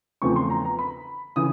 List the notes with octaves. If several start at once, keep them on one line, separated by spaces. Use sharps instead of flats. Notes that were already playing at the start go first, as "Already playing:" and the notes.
E2 C#3 F3 A3 C4 C#6
C6
A#5
A#5
B5
C#3 E3 D#6